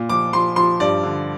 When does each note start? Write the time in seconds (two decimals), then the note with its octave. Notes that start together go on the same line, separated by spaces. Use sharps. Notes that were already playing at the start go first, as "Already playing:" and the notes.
Already playing: A#2
0.09 F3 D6
0.33 F3 C6
0.56 F3 C6
0.80 G2 D5
1.03 D3